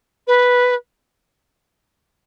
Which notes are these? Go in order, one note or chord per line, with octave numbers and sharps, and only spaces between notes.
B4